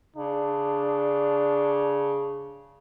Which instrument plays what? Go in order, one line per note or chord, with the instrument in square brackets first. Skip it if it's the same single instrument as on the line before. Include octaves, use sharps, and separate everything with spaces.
[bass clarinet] C#3 [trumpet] D4